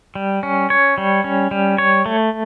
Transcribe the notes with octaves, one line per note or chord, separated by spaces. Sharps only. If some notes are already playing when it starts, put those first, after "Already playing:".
G3
C#4
C#5
G3
C#4
G3
C#5
A3